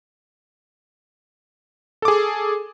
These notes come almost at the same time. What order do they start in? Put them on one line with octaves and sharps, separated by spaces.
A4 D6 G#4